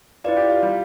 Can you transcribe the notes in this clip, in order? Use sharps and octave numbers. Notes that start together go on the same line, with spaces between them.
E4 F4 B4 D5
G4
F4
G3